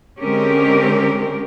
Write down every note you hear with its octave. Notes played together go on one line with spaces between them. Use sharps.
D3 G#3 C4 C#4 G4 A#4